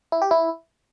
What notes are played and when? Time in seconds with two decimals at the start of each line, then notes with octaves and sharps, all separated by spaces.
0.12 E4
0.22 G4
0.31 E4